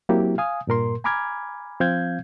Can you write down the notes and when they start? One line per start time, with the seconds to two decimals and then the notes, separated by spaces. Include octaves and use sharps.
0.09 F#3 A#3 C4 E4 G4
0.38 F5 G#5 D#6
0.67 G2 A#2 A#4 C6
1.04 G#5 A#5 B5 D6 F6 G#6
1.80 F3 C4 F5 G6 G#6